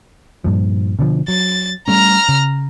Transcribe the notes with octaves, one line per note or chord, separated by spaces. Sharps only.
G2 A#2 F3
B2 D3 F3
F#3 A6
G3 A3 C#4 A#5 F6
C#3